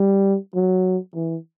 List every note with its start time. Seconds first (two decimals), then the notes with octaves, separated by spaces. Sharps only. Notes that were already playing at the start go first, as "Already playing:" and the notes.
Already playing: G3
0.55 F#3
1.15 E3